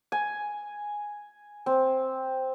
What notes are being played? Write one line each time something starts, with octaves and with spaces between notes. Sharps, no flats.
G#5
C4